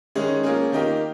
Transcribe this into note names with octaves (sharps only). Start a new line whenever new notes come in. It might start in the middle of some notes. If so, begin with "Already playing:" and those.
D#3 G#3 C#4 G#4
F3 A#3 C#4 G#4
D#3 A#3 D#4 G4